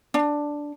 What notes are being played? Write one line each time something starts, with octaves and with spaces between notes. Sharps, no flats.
D4